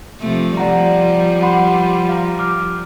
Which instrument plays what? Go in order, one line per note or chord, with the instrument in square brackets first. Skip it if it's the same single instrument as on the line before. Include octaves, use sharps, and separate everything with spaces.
[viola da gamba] C3 F3 A3
[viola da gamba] F3 G3 [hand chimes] D5 F#5 A#5
[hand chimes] F#5 B5 C6
F5 A#5
D6 F6